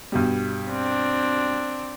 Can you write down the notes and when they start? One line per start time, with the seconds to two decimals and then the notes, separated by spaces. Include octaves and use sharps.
0.12 G2 B2 G3
0.70 C4 D4